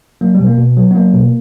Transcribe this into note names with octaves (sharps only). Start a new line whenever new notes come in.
F#3 A#3
B2 G3
A#3
B2
F#3
B3
F#3 A#3
B2